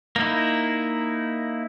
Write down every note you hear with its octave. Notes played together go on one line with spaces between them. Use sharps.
A#3 D#4 E4